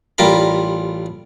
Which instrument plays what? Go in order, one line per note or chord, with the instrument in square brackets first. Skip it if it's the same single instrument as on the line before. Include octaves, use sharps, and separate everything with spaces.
[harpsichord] A1 G3 F4 A#4 A#5 B5